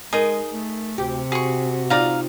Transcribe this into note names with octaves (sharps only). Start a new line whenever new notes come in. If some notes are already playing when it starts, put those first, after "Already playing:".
G#3 D#4 G#4 A#4 D#5
A3
D2 C3 G4
F#4 G#4 C#6
D#4 F4 D5 F5 A#5